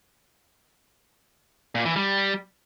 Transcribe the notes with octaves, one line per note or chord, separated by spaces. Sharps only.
A#2
E3
G3